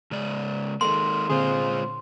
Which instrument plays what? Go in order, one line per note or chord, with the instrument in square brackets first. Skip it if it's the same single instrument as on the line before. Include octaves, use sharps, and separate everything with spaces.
[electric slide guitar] C#3 G#3 D5
[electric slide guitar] D#3 G#3 A#3 [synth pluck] G#4 A4 [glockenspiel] C6
[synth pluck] A#2 D3 C4 [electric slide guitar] G#3 F4 [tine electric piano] G#4 C5